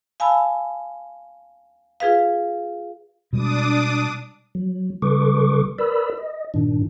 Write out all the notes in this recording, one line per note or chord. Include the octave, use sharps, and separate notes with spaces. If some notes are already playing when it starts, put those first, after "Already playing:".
F5 G#5 A5 B5 E6
F4 G#4 B4 F5
B2 G3 G#3 D4 D6 D#6
F#3
C#3 G3 A4 B4 C#6 D6
A#4 B4 D5 B5 E6
D#5
G2 A#2 D#3 D4